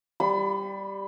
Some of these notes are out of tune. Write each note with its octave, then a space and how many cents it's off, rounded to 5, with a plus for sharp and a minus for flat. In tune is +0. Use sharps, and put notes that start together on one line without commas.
G3 +0 B5 +35